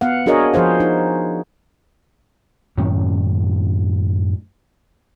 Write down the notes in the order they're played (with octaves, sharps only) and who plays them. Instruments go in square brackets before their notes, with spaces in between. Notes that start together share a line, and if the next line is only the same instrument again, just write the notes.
[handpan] B3 F5 F#5
D4 F#4 G#4 A#4 C#5 D#5
F3 G#4 C5 F5
D#4
[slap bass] F#2 A2 D#3 C#4